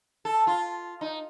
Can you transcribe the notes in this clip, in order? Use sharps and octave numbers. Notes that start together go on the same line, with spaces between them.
A4
F4
D#4